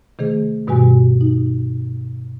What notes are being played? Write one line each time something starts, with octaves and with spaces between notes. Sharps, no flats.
C3 D#3 A3 G#4
G2 B2 D#3 G3 F#4 G#5
D#4